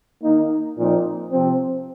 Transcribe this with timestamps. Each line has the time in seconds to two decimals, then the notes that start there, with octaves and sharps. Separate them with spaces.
0.21 D#3 A#3 D#4
0.76 A#2 F3 C4 D#4
1.30 C3 F3 C4